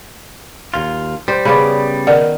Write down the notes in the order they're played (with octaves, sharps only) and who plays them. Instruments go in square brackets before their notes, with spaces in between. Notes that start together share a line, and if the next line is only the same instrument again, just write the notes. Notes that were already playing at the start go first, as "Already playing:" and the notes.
[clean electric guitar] D#2 F4
[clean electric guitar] G3 [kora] C5
[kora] C#3 B3 D5 [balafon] B5
[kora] D#3 [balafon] A#4 D5 F#5